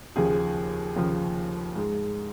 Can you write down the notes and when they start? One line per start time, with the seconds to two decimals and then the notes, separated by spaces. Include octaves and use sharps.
0.16 D#2 C#3 F3 G#4
0.96 D#2 C#3 F3
1.76 G#2 G#3